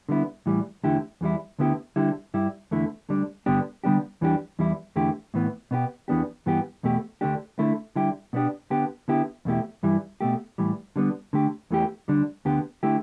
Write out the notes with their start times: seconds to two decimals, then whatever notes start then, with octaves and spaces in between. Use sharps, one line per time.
0.09 D3 G3 B3 E4
0.46 A2 E3 G3
0.83 E2 D3 A3 E4 G4
1.21 E2 E3 G3 E4
1.59 D2 D3 B3 E4 G4
1.96 D3 G3 E4 G4
2.34 G2 G3 E4 G4
2.71 E2 D3 A3 E4
3.09 D2 D3 G3 D4
3.46 G2 D3 B3 D4 G4
3.84 D3 G3 B3 D4 G4
4.21 E2 E3 G3 D4 G4
4.59 E2 E3 G3 E4
4.96 E2 D3 A3 E4 G4
5.34 A2 E3 B3
5.71 B2 B3 E4 G4
6.08 E2 E3 B3 D4 G4
6.46 G2 E3 B3 G4
6.83 E2 B2 A3 G4
7.21 D2 D3 A3 D4 G4
7.59 D3 A3 E4
7.96 D3 G3 E4 G4
8.33 B2 B3 D4 G4
8.70 D3 B3 G4
9.08 D3 B3 E4 G4
9.45 E2 B2 A3 E4 G4
9.83 G2 E3 G3 E4
10.21 B2 A3 G4
10.58 A2 E3 G3
10.96 D3 G3 B3
11.33 D3 A3 G4
11.71 E2 E3 A3 E4 G4
12.08 D2 D3 G3 D4
12.45 D2 D3 B3 G4
12.83 D3 A3 E4 G4